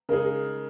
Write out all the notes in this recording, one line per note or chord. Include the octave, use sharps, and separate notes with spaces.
C#3 G#3 D#4 G#4 A#4